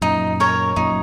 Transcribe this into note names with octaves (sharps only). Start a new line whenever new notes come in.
F#2 A#2 D#4
A#4 C#5
F#2 A#2 D#4